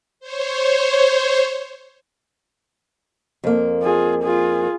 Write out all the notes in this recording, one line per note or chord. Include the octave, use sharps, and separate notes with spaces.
C5 C#5
F2 A#3
F4 G#4
F4 G#4